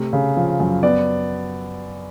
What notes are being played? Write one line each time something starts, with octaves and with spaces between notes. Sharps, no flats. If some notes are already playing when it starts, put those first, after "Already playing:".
Already playing: C3 A3
C#3
F3
F#2
B3 D5